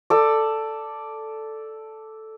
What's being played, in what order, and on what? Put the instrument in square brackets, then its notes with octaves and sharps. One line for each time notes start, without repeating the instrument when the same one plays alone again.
[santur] A4 D5